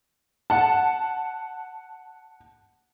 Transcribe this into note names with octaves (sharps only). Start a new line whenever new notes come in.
F#5 A5